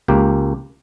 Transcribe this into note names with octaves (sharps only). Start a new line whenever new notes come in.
C#2 A#3 G4